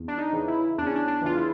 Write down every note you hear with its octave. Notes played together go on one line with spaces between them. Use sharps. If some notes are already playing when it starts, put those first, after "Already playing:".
Already playing: E2
D4
D#4
C#3 E3
E4
E2 D4
C#4
D4
D4
C#3 E3 F4
E4